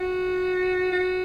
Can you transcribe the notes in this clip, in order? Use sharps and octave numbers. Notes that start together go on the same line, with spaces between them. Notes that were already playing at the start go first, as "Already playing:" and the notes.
Already playing: F#4
F#4